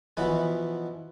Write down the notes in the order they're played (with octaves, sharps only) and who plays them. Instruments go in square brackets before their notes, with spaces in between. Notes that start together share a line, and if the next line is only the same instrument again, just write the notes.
[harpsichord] B2 E3 F3 C#4 E4 B4